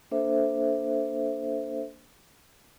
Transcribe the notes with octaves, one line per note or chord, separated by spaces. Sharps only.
A#3 D4 A4 C5 E5